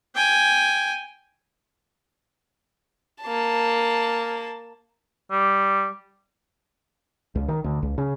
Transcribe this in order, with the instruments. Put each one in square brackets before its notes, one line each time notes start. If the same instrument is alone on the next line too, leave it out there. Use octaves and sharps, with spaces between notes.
[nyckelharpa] G5 G#5
[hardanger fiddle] A#3 A5
[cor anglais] G3
[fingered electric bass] C#2
D#3
D2
C#2
C#3